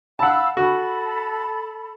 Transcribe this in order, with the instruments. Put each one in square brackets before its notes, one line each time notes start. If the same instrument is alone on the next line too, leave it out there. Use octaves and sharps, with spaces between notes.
[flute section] F5 B5 E6 [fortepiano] F#5 A5
[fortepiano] F#4 [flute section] A4 B5